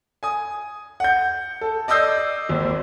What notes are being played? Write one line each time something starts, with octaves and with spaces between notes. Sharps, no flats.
G#5 D#6
F#5 G6
A4
D5 D#5 D#6 E6 G6 C7
G#1 D#2 C5